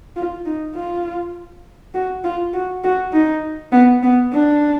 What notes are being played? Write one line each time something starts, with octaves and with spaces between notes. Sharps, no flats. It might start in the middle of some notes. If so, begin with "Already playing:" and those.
F4
D#4
F4
F#4
F4
F#4
F#4
D#4
B3
B3
D4